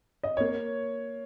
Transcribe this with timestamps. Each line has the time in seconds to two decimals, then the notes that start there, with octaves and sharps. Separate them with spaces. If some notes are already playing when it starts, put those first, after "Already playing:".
0.23 D#5
0.37 A#3 C#5